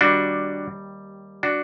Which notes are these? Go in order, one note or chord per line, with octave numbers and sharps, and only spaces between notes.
D#2 D#3 G3 D4 F#4
D4 F#4